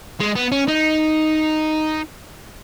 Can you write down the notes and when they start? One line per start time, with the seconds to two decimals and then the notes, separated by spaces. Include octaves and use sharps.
0.20 G#3
0.36 B3
0.52 C#4
0.68 D#4